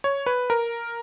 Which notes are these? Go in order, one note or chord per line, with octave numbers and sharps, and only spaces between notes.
C#5
B4
A#4